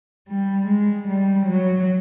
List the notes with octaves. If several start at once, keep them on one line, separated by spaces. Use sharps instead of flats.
G3
G#3
G3
F#3